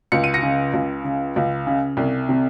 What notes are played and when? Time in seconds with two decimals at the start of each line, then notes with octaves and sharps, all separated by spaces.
0.12 C#2 C#7
0.24 D#7
0.34 A#6 C#7
0.43 C#3
0.74 C#2
1.04 C#3
1.36 C#2
1.67 C#3
1.97 C2
2.29 C3